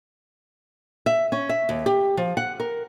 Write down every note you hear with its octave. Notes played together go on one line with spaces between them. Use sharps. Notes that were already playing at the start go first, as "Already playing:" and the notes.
E5
C#4
E5
D#2
G4
F3
F#5
A#4